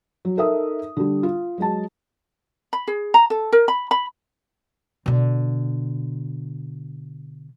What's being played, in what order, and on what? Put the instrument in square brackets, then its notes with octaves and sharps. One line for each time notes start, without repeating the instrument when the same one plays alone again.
[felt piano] F#3
D#4 A4 A#4 E5 D#6
D3 G3
F4
F#3 G#3 A5
[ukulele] B5
G#4
A#5
A4
A#4
B5
B5
[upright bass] B2 D3